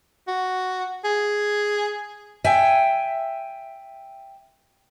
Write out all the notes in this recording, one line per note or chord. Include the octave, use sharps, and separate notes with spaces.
F#4
G#4
E5 G5 G#5